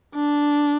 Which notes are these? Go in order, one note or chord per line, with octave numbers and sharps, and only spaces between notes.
D4